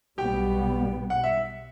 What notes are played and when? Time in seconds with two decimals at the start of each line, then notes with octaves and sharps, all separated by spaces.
0.18 B1 B2 G3 B3 G4 G5
1.10 F#5
1.24 E5